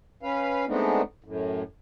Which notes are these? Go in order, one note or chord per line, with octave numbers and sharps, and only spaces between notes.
C#4 B4 F5
G#3 A3 B3 C4 D4 D#4
F#2 A2